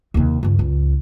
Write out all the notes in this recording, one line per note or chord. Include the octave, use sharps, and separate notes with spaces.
D#2 C3
C#2 G2
C#2